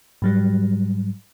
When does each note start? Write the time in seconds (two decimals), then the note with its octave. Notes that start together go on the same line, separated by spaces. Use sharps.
0.22 G#2 F#3 G3